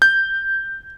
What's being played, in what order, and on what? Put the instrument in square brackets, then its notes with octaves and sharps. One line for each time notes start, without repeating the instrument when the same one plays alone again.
[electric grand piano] G6